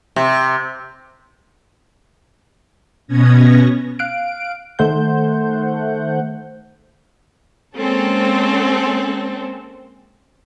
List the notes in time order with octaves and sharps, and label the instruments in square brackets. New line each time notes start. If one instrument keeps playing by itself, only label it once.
[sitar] C3
[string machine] B2 B3 C#4 G#6 A#6
[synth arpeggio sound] F5 F#6 D7
D#3 A3 C5 F#5 G6
[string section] G#3 A#3 C4 C#4 A4